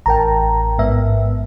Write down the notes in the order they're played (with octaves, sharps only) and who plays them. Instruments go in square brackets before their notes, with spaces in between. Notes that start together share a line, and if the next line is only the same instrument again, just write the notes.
[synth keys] A1 A#4 [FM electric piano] G5 A5 A#5
[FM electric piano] G#2 B3 E5